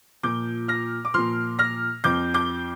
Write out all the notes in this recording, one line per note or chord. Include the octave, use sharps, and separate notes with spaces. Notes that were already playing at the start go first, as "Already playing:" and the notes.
A#2 F3 D6 G6
F6 A#6
D6
A#2 F3 C6 F6
F6 A#6
F2 F3 D6 G6
D6 G6